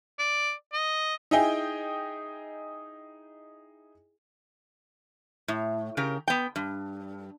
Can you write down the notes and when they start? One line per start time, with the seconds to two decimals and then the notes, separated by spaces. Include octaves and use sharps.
0.19 D5
0.73 D#5
1.31 D#4 E4 G#4 D#5 G5 G#5
5.48 A2
5.97 C#3 G4 A#4
6.28 B3 G5
6.56 G2